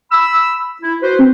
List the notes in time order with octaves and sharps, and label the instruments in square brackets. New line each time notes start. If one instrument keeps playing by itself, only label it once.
[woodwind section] B5 E6
E4
F#4 B4 C5
[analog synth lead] C4